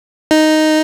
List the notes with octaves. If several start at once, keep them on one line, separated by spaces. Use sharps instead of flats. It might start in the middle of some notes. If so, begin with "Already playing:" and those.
D#4